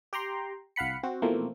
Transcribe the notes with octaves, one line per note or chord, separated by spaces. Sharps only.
G4 G5 A#5 C6
C2 F5 F#5 B5 C#7
C4 F#4
B2 E3 F3 A3 A#3 C4